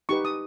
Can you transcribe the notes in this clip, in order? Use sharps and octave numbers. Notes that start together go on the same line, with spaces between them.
D#4 G4 B4 C#6
D#6